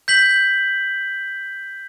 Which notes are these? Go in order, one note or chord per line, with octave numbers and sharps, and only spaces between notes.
G6 B6 F#7